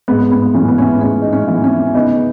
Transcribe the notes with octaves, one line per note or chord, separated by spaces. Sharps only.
G#2 B3
B3
E3 B3 C#4
B3
C#4
G#2 C#4
D#4
C#4
E3 B3
C#4
C#3 B3 D#4